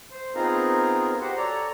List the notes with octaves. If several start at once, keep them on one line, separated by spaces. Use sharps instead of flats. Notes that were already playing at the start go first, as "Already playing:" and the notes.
C5
B3 C4 D#4 F4 G#4 A#4
F#4 G4 C5 F#5
A4 C#5 D5 A#5